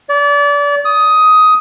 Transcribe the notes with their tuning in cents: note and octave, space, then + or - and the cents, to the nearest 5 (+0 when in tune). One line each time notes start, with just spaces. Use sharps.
D5 -30
D#6 +10